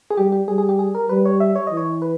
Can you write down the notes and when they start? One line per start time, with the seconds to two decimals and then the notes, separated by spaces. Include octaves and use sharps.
0.10 G#4
0.17 G3 G4
0.32 G4
0.48 G3 G#4
0.58 G#4
0.69 G4
0.79 G#4
0.95 A#4
1.09 G3 B4
1.25 C#5
1.40 E5
1.56 C#5
1.67 E3 D#5
1.77 C#5
2.02 B4